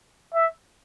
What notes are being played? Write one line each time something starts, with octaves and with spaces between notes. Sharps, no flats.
E5